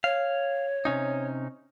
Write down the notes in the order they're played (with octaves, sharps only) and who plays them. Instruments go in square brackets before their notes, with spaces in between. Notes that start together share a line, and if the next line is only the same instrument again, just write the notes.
[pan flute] C#5 [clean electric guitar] F5
[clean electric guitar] C3 C#4 D#4